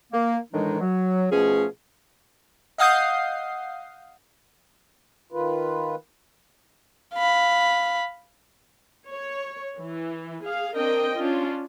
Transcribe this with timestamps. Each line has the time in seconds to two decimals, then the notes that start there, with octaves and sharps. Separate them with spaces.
0.13 A#3
0.53 A2 D#3 E3 G#3 D4 D#4
0.80 F#3
1.31 B2 F3 A3 C#4 G#4
2.78 D#5 F5 F#5 D#6 G6 C7
5.32 D#3 F4 B4
7.14 F5 B5
9.08 C#5
9.78 E3
10.45 G#4 F5
10.76 C4 D4 A#4 D#5 G5
11.17 C#4 D4 F4